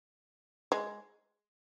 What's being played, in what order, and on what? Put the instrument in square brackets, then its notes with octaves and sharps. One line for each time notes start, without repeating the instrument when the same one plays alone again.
[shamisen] G#3